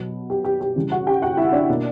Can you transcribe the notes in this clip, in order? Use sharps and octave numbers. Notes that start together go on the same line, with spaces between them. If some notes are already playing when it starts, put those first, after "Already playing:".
Already playing: B2 F#3 B3
G4
G4
G4
C#3 E3 G3
F#4 F#5
G4 G5
F#4 F#5
E4 E5
D4 D5
B2 A#3